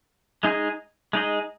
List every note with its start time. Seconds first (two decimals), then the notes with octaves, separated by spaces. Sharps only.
0.43 G#3 D#4 G#4 D#5
1.13 G#3 D#4 G#4 D#5